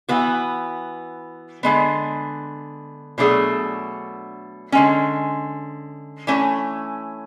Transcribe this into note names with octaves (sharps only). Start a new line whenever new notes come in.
E3 B3 F#4
D3 G#3 B3
B2 F#3 A3 D4 G#4
D3 G#3 C#4
E3 A3 C#4